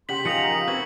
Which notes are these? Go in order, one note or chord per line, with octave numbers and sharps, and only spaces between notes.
C#3 G4 F#5 C6 B6 F#7
F3 D#4 A#4 D#5 F5 G#5 C#7 F7
C4 B4 C#6 G#6 F#7